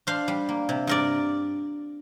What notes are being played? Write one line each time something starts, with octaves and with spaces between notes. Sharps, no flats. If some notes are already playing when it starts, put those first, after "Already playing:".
D4 C5 F5
G3
A#3
C3
G2 A#4 D5